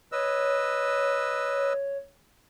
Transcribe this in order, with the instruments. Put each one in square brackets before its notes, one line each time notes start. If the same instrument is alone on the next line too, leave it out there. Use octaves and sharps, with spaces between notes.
[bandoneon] B4 D#5 E6 [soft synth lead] C#5